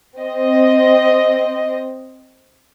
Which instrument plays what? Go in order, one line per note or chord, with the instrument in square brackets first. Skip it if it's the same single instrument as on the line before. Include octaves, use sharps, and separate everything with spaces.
[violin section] C4 D#5